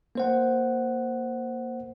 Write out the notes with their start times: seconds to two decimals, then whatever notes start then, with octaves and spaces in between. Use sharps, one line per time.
0.15 A#3 C5 F#5